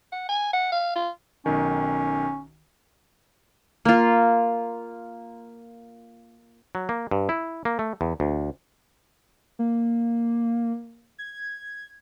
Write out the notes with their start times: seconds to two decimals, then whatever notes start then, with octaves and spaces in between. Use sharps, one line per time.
0.12 F#5
0.29 G#5
0.54 F#5
0.72 F5
0.96 F4
1.46 B1 D#3 C#4
3.85 A#3 F4
6.75 F#3
6.89 A#3
7.11 G2
7.29 E4
7.65 A#3
7.79 A3
8.01 E2
8.20 D2
9.59 A#3
11.19 G#6